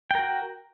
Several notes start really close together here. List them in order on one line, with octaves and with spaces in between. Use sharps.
G5 A#4 F#4